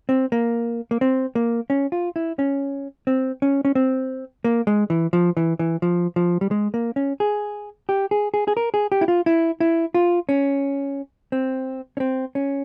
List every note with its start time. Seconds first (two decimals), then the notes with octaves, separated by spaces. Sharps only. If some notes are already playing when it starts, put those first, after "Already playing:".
0.09 C4
0.32 A#3
0.91 A#3
1.01 C4
1.35 A#3
1.70 C#4
1.92 F4
2.16 E4
2.39 C#4
3.07 C4
3.42 C#4
3.65 C#4
3.75 C4
4.44 A#3
4.67 G#3
4.90 E3
5.13 F3
5.37 E3
5.59 E3
5.82 F3
6.16 F3
6.41 G3
6.51 G#3
6.74 A#3
6.96 C#4
7.20 G#4
7.89 G4
8.11 G#4
8.34 G#4
8.48 G#4
8.57 A#4
8.74 G#4
8.92 G4
9.01 E4
9.08 F4
9.26 E4
9.60 E4
9.94 F4
10.29 C#4
11.32 C4
11.97 C#4
12.00 C4
12.35 C#4